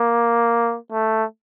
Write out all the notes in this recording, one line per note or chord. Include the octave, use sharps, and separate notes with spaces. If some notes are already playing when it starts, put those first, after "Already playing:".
Already playing: A#3
A3